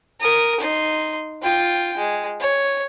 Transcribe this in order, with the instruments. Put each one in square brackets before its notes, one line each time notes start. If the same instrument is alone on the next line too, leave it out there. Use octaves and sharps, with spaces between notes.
[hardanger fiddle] A#4 D#6
D#4 C6
F4 G5
G#3
C#5